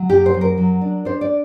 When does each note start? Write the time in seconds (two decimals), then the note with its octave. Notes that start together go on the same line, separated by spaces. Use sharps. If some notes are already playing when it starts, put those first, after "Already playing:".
Already playing: F#3
0.09 F#2 G4
0.26 C5
0.34 F#2
0.41 A#4
0.58 F#3
0.81 D4
1.05 D4 C5
1.21 D5